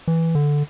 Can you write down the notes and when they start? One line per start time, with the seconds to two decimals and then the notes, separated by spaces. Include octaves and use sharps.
0.08 E3
0.35 D3